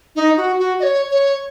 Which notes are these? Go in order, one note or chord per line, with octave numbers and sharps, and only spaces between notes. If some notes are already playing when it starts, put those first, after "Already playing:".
D#4
F#4
F#4
D#5
C#5
C#5